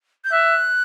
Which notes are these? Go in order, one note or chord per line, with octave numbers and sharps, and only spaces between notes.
G6
E5 F#6